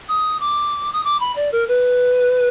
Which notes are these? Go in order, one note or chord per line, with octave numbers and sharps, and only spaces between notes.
D#6
D6
D#6
D6
B5
D5
A#4
B4